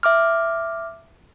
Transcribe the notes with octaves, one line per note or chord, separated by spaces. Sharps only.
E5 D6 F6